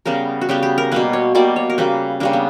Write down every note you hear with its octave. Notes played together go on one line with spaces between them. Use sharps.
C#3 G3 B3 A#4
F#4
C#3 G3 B3 G4
G4
A#4
B2 G3 A#3 B4
C#5
B2 G3 A#3 D5
C#5
A#4
C#3 G3 A#3 B4
C#3 G3 A#3 D4
B3